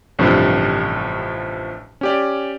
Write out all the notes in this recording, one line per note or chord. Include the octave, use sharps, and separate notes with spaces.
A1 G2 C3 F3 G3
C#4 G4 D5